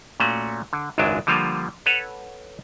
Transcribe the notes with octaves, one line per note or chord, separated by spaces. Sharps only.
A#2 A3 C#4 F#4
D3
G#1 C#2 F#2 F#3 G#3 D4
D3 F3 G3 A#3 F4
A4 B4 C#5 F#5